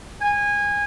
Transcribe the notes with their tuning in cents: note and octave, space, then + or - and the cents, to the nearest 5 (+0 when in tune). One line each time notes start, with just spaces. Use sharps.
G#5 -20